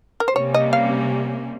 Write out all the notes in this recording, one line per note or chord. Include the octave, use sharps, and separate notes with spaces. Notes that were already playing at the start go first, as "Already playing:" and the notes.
A#4
C5
C3 G3 A#3 C#4 C#5
D#5
F5